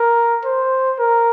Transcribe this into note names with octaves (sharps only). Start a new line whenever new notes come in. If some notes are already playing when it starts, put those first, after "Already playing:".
Already playing: A#4
C5
A#4